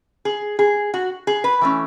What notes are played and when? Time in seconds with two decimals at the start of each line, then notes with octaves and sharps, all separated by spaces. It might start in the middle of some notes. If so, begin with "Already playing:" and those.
0.25 G#4
0.59 G#4
0.94 F#4
1.27 G#4
1.44 B4
1.61 E3 A3 C#4